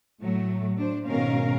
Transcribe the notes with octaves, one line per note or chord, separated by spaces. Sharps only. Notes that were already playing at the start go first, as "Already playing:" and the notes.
A2 F#3 A3
D4 C5
G#2 B2 D#3 C#4 A#4 F5